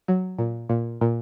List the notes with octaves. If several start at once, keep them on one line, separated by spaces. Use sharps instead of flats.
F#3
A#2
A#2
A#2